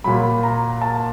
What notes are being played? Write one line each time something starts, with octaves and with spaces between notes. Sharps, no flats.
A#2 F#3 B5
A#5
A5